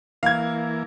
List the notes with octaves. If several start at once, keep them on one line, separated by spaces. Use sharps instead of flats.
E3 A#3 F5 G#6